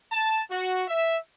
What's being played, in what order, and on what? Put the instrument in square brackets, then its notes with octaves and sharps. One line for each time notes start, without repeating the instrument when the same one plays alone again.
[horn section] A5
F#4
E5